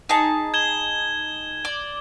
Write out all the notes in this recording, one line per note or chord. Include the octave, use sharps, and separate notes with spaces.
D#4 G#4 A5
G#6 E7 G7
D5